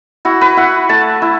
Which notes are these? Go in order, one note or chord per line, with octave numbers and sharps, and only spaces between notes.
E4 F#4
B4
E4 F#5
A3 A5
E4